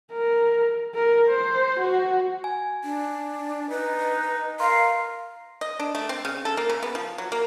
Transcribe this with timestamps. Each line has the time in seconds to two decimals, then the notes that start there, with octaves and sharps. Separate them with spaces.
0.13 A#4
0.95 A#4
1.29 C5
1.80 F#4
2.44 G#5
2.84 D4
3.70 D#4 B4
4.60 A#4 F5 C6
5.61 D#5
5.79 D4
5.95 A3
6.09 C4
6.25 C#3
6.45 A4
6.57 A#3
6.69 C#3
6.83 B3
6.95 F3
7.18 F#3
7.32 A#3